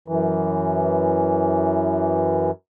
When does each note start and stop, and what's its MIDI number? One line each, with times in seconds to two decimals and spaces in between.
0.08 2.51 42
0.08 2.51 52